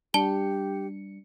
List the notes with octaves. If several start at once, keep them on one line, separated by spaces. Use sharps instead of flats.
G3 D4 G4 A5 C#7 G7